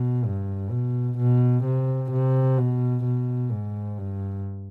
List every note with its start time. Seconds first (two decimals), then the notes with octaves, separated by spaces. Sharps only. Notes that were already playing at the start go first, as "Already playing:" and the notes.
Already playing: B2
0.25 G2
0.71 B2
1.19 B2
1.64 C3
2.12 C3
2.58 B2
3.05 B2
3.51 G#2
3.98 G2